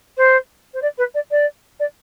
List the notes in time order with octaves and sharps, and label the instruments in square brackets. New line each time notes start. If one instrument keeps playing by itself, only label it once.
[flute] C5
C5
D5
B4
D5
D5
D5